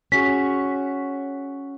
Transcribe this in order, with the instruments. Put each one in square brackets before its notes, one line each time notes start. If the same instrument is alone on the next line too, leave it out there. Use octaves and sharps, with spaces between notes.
[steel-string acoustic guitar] C#4 F#4 G#4 [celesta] B6